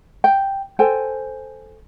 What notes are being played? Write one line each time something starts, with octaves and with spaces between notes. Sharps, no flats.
G5
A4 C5 G5 G#5